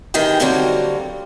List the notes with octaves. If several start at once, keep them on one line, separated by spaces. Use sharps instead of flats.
D#2 D#3 E3 G#4 G5
D3 F#3 G3 A#3 C4 F#4